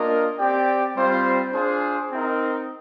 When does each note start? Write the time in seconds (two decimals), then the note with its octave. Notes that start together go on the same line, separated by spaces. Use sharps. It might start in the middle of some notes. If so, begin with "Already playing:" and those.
Already playing: A#3 D4 F4 A#4 D#5
0.39 C4 G4 D5 G5
0.97 G3 C4 F4 C5
1.53 D4 F4 G#4 C5
2.11 C4 D#4 A#4